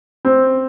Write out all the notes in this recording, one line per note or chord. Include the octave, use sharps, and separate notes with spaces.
C4